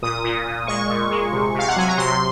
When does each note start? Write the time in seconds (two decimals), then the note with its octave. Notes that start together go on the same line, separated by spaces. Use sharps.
0.02 A#2 D#6
0.24 A#2
0.46 A#2
0.67 G#3 C#6
0.89 A#2
1.10 G#3
1.32 C3
1.54 C3 F5
1.68 F#5
1.76 F#3 G#5
1.88 A#5
1.98 C3 C6